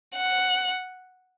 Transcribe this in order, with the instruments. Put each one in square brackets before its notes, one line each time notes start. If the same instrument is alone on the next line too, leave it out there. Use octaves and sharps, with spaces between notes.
[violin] F#5